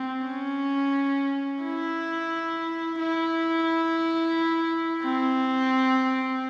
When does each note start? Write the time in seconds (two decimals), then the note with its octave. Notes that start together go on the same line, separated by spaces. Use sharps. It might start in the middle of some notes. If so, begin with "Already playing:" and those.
Already playing: C4
0.27 C#4
1.63 E4
3.00 E4
5.04 C4